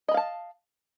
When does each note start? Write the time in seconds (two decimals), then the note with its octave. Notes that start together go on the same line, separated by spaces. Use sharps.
0.08 D#5
0.11 B5
0.14 F5
0.17 A5